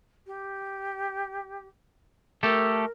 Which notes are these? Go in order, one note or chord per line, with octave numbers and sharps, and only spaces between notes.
G4
A3 G4 A4 A#4